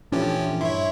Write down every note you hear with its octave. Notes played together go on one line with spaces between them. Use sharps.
A#2 E3 F3 A3 C#4 D4 G4
G2 E4 C#5 E5 C6